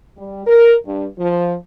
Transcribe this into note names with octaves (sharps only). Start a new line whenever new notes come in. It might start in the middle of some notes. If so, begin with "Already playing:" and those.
G3
A#4
G2
F3